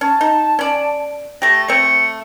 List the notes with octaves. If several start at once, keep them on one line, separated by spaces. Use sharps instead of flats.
C#4 A5
D#4
C#4 D5
A3 G4 A#6
A3 C4 C#7